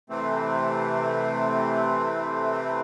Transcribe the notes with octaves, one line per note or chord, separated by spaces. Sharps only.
C3 E3 A3 C4